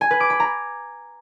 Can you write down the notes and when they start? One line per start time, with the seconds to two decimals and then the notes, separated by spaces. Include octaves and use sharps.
0.01 G#5
0.11 B4
0.20 D6
0.30 B5
0.40 A#5